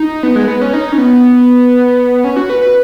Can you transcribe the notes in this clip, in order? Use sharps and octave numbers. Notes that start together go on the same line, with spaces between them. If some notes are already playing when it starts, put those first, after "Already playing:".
Already playing: D#4
B3
G#3
B3
C#4
D#4
C#4
B3
C#4
F#4
B4
B4